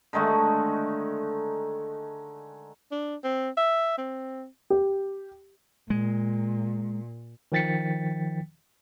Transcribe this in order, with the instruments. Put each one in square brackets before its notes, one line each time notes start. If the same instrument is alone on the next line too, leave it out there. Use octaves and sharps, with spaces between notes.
[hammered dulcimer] D3 D#3 G#3 A3
[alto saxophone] D4
C4
E5
C4
[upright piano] G4
[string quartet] A#2 [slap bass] G#3
[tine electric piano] D#3 F3 G5 A6 B6 C#7